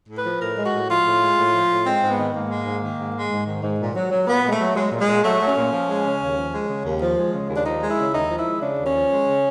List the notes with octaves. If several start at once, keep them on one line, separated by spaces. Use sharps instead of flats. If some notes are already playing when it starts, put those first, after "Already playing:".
A2
B4
F3
A2 A#4
G#3
F#4
A2
F3 F4
A2
G#3
A2
F3
A2
G#3 C4
G#2
B3
D#3
G#2 A#3
G#3
G#2
D#3
G#2
G#3
G#2
D#3
G#2
A#2
F#3
F#3
A#2 B3
A#2 G#3
A3
F#3
F#3 G#3
A#2
G#3
A#2
F#3 A3
F#3
C#4
A#2
F3
G#3
C#3
D#2
F3
G#3
C#3
D#2
F3
G#3
C#3
D#2
D4
F3 D#4
G#3
E4
C#3
D#2 D#4
F3
E4
G#3
C#3 D4
D#2
C#4
F3
G#3
C#3